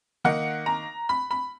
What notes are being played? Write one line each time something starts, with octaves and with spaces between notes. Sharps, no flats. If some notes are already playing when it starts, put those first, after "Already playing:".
D#3 A#3 D#4 F#5
A#5
B5
B5